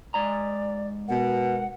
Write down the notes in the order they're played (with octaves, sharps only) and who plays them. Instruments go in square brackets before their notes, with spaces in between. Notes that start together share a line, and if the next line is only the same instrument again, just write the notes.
[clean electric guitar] G#2 A#5 [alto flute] D5
[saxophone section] B2 [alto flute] A#4 [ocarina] F#5